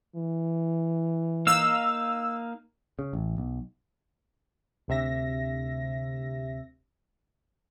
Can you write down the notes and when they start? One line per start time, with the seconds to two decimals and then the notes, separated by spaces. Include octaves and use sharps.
0.16 E3
1.47 A#3 D#4 F5 E6
2.99 C#3
3.13 A1
3.38 B1
4.88 D2 C3 E5 A#6